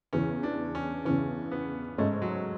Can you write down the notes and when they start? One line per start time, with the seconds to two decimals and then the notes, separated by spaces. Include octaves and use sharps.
0.13 E2 C#3 E3 C#4
0.43 D4
0.75 C#4
1.05 E2 C#3 E3 C#4
1.51 B3
1.98 G#2 G#3 A3 C#4
2.22 F#3